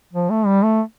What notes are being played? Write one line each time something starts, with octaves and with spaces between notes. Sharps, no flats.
F3
A3
G3
A3